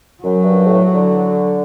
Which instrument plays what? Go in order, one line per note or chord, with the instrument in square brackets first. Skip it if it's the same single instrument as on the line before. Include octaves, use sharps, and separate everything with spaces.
[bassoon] F#2 [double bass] F#3
[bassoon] G2
A2
D3